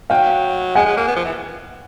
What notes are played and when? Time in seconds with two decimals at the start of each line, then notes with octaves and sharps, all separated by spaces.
0.10 F#3 F5 G5
0.75 G#3 F#5 G#5
0.86 G#3
0.97 A#3
1.08 B3
1.16 F3
1.25 E3